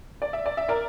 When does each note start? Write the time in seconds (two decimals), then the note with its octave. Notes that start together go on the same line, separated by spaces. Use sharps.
0.22 D5
0.33 E5
0.46 D5
0.57 E5
0.68 A#4 D5